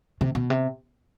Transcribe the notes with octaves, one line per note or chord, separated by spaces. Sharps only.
C3
B2
C3